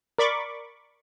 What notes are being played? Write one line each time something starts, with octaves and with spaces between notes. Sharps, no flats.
A#4 D5 B5 C#6 D6